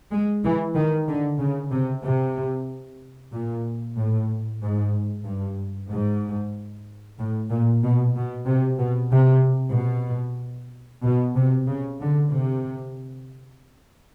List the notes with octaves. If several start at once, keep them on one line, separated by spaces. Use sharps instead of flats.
G#3
E3
D#3
D3
C#3
C3
C3
A#2
A2
G#2
G2
G#2
A2
A#2
B2
B2
C3
B2
C3
B2
B2
C3
C#3
D3
C3